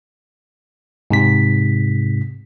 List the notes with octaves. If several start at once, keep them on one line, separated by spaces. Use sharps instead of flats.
G#2 C3 B6